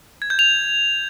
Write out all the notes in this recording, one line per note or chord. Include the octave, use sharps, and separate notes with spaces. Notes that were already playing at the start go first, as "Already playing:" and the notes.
G#6
G6
F7